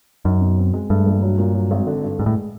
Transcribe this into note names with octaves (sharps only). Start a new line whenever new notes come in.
F#2 D#4
B2
C4
G#3
G2 A3
A#1
F#3
A#2
F#3
G#1
D3
G2
G#2 G#3
A2